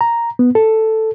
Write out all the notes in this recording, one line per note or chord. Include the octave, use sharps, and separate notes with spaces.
A#5
B3
A4